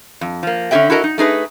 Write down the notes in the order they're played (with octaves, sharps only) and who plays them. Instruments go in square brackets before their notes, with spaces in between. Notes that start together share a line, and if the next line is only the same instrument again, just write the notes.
[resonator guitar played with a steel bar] F2
F3 A#3
D3 C#4 F4 G#4 E5 G5
E4 F#4 A4 A#4 C#5 D#5
D#4
A3 D#4 G#4 B4